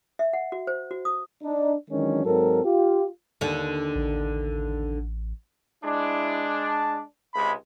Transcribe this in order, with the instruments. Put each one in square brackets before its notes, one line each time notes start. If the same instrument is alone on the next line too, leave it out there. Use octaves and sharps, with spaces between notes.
[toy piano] E5
F#5
F#4
C5
F#4
D#6
[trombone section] D4 D#4
D#3 E3 F#3 G#3 C#4 D4
G#2 F#3 C4 A4 A#4
F4 G4
[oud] D#2 D3
[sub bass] A1
[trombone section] G#3 D4 [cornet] E4
[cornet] A5
[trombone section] C#2 C3 G#3 [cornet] B5